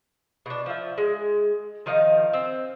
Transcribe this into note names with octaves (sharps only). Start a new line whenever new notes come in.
B2 D4
F3 E5
G#3
D#3 F3 D#4 F5
C4